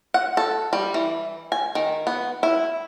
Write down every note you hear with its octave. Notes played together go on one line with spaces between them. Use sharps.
F#5
A4
G3
E3
G#5
D#3
B3
E4